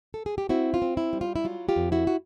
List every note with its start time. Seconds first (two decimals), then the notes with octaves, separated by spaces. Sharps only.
0.14 A4
0.26 G#4
0.38 G4
0.49 C4 E4 F#4
0.74 F4
0.82 C4
0.97 E4
1.13 G3
1.21 F4
1.36 E4
1.44 F#3 F4
1.69 F4 G4
1.76 F2
1.92 E4 F#4
2.07 F#4